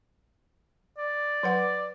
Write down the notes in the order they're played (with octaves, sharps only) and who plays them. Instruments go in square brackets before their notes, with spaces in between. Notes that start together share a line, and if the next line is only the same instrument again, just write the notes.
[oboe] D5
[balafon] F#3 B4 F#5